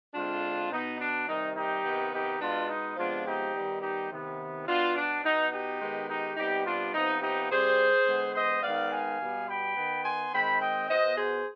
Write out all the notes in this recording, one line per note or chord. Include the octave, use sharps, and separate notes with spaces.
D3 G#3 C4 D4 F4
B2 B3 D#4
D4
C3 D#3 G3 D#4
D#4 G4
C3 D#3 B3
D#4 G4
B2 G#3 B3 D4 F4
D#4
C3 F3 G#3 B3 D4 F4
D#4 G4
D#3 G3 B3
D#4 G4
C3 D#3 B3
B2 B3 D4 F4
D4
B2 B3 D#4
D#4 G4
D#3 G#3 B3
D#4 G4
C3 G3 B3 D#4 G4
D4 F4
C3 F3 B3 D#4
D#4 G4
C3 G3 C4 G#4 C5
D3 G#3 B3
C5 D#5
D#3 G#3 B3 D5 F5
F5 G#5
B2 G3 B3
G5 B5
D#3 B3
G#5 C6
D#3 G#3 C4 G5 B5
D#5 G5
B2 B3 C5 D#5
G#4 C5